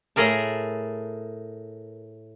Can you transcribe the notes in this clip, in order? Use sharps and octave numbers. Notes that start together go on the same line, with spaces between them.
A2 A3 G#4 A#4 A5